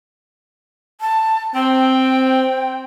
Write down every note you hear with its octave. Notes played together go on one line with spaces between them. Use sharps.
A5
C4 G5